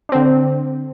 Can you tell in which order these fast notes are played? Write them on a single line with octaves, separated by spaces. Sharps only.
D4 C4 D3